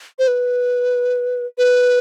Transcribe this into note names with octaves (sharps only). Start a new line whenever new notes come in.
C5
B4
B4